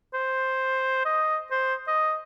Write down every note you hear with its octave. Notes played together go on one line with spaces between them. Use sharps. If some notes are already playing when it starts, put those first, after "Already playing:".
C5
D#5
C5
D#5